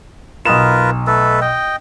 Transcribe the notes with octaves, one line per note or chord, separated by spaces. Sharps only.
B1 F4 A#4 B4 D#6 E7
A3 A4 B4
D#5 G5